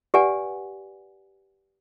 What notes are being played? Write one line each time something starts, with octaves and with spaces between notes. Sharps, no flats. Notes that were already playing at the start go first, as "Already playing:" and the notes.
G4 B4 D5 F#5 G#5